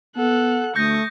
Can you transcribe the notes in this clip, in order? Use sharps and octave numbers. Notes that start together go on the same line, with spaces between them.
B3 A4 F#5 F#6
D2 A3 C#6 D#6 G6 A#6